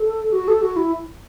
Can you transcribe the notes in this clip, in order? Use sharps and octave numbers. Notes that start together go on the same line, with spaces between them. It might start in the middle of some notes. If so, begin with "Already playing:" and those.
Already playing: A4
F#4
A4
F#4
E4